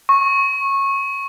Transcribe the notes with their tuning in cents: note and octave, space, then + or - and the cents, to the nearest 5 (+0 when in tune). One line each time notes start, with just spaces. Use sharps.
C#6 -20